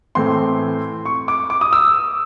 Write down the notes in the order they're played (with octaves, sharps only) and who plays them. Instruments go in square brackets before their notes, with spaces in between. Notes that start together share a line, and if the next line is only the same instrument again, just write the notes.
[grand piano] A2 E3 A3 C4 C6
C#6
D6
D6
D#6
E6